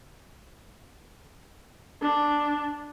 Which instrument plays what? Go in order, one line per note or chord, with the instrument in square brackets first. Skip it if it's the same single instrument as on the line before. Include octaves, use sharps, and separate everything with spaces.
[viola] D4